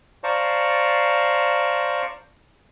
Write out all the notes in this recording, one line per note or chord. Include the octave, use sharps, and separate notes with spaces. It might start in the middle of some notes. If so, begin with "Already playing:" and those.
C5 D5 F5 A5 A#5 C#6